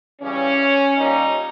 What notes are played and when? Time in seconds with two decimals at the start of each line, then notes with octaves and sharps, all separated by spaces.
0.21 C#3 E3 G3 C#4
0.97 A#2 G3 A#3 D#4